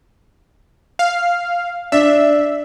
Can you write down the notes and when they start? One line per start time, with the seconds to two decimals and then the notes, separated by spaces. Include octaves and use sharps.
0.99 F5
1.92 D4 E5